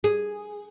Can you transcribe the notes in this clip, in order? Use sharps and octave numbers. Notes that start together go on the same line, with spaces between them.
G#4